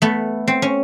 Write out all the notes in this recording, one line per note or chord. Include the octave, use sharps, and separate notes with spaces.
A3 B3
C4
C#4